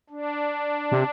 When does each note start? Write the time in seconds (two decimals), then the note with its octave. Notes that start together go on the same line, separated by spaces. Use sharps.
0.10 D4
0.92 C3